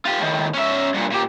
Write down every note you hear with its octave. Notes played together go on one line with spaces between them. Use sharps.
F4 G4
A2 D#3
C#4 E5
G2 A#2
A#2 G4